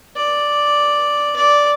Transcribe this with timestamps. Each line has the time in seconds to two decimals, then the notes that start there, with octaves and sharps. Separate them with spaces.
0.16 D5
1.36 D5